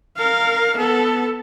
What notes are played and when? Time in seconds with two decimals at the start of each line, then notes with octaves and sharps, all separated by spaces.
0.17 A#4 F5
0.77 B3 A4